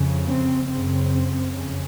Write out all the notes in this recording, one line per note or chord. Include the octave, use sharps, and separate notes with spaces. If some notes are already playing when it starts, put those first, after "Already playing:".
Already playing: F2 C#3
C4
F#2 C#3 C4
F2 C#3 C#4